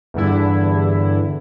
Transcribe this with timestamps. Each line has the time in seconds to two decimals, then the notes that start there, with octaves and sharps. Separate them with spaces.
0.14 E2 G2 D3 E4